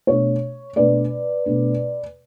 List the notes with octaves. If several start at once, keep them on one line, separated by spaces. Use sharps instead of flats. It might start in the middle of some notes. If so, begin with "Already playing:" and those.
B2 A3 D4 C#5
B2 A3 D4 B4 D5
B2 A3 D4